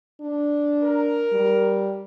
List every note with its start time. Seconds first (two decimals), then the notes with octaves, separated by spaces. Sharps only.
0.21 D4
0.83 A#4
1.32 G3